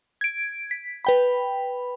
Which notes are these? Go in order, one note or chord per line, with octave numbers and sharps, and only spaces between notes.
G#6 D7
B6
B4 G5 B5